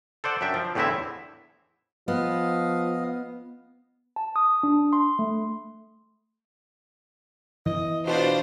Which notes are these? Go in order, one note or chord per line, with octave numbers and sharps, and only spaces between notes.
A4 C5 D5 F#5
F#2 D4 E5 G5
F3
E2 A2 D3 C4 E4 E5
F3 B3 D#5 F5
A5
D#6
D4
C6
A3
E3 D#5
B2 D4 F4 C5